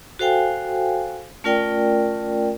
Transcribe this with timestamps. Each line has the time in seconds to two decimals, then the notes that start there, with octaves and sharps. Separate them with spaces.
0.19 F#4 A4 C5 F5 G5 G#5
1.44 A3 C#4 F4 A#4 D5 G5